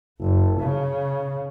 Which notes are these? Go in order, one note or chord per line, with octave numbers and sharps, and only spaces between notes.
F#1
C#3